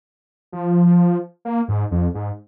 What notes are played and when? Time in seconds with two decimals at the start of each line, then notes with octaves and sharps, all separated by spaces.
0.52 F3
1.45 A#3
1.68 G#2
1.91 F2
2.14 G#2